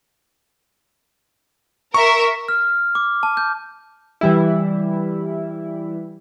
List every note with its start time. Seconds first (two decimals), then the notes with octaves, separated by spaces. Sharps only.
1.94 A#4 E5 C#6
2.48 F6
2.95 D6
3.23 A5
3.37 G6
4.21 E3 G3 E4